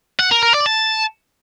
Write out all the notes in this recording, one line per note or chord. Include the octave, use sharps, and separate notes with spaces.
F#5
A#4
A#4
D5
A5